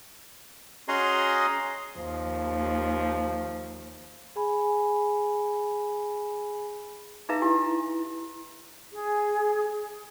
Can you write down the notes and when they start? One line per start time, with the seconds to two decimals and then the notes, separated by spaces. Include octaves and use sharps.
0.88 C#4 F#4 G#4 D#5 A#5 C6
1.97 D#2 F3
4.36 G#4 G#5 B5
7.29 D#4 G#4 B4 E5 F5 A#5
7.42 E4 G4 G#5
8.91 G#4